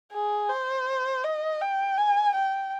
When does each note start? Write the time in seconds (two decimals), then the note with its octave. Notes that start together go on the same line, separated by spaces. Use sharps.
0.12 G#4
0.49 C5
1.24 D#5
1.61 G5
1.98 G#5
2.35 G5